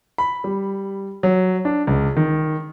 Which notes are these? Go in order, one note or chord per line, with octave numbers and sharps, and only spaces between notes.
B5
G3
F#3
D4
C#2
D#3